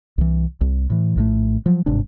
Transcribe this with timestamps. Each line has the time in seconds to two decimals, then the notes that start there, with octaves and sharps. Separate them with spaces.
0.18 C2 E3
0.61 C2
0.90 A2 E3
1.16 A#1 A2 A3
1.66 F3 F#3
1.86 G1 G#2 C3 D4